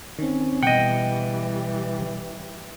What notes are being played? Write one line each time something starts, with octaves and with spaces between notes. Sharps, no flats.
D#3 C4 C#4
B2 E3 G3 D#5 F#5 G5